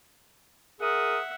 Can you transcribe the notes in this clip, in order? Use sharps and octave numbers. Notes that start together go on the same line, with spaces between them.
G#4 A#4 E5 F#5 D#6